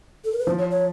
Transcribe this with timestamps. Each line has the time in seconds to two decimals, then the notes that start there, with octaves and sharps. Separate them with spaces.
0.25 A4
0.32 A#4
0.39 B4
0.46 F3 C5
0.58 C#5
0.71 C#5